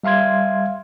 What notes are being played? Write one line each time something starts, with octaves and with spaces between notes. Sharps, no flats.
G3 E5 F5 C6 G#6